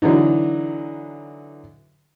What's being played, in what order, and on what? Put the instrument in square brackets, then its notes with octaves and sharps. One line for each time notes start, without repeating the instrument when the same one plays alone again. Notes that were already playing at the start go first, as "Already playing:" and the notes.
[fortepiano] D3 E3 F#3 D#4